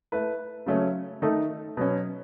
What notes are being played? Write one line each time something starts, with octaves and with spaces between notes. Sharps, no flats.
A3 E4 B4
C#3 F#3 A3 C#4
D#3 A3 D#4 A4
B2 F#3 C#4